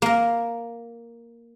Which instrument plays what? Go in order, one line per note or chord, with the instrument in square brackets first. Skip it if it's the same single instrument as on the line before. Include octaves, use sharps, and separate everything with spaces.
[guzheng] A#3 A#4